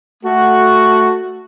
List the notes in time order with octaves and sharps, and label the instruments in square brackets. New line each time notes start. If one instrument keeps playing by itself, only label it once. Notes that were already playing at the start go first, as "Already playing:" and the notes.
[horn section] A3 F#4